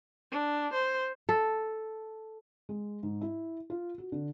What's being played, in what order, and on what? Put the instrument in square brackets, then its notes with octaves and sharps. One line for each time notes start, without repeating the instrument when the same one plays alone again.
[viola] D4
C5
[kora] A4
[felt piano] G#3
G#2
E4
F4
F#4
D3